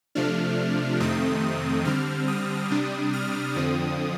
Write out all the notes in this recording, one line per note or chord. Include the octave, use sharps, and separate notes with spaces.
C3 F3 A3 D4 F6
F2 C3 D#3 A3 C4 D#6
D3 G3 C4 F6
D#6
C3 G3 D4
F6
F2 D3 F3 C4 D#6